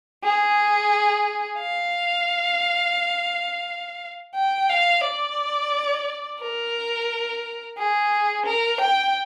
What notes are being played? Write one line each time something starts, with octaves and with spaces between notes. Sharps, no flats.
G#4
F5
G5
F5
D5
A#4
G#4
A#4
G5